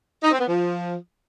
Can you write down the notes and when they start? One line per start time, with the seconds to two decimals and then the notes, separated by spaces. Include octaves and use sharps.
0.23 D#4
0.31 C4
0.39 B3
0.46 F3